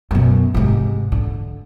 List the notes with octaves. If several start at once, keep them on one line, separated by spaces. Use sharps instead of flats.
F#2 B2
G#2 C3
D3